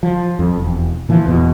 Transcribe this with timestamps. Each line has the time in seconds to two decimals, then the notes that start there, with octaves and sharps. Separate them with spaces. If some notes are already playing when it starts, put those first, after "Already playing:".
0.03 F3
0.39 F2
0.58 E1
1.09 A#2 E3 F3
1.25 E1 E2 B2